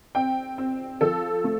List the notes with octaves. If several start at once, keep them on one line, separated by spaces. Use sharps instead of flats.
C4 G5
C4
F3 A4
A3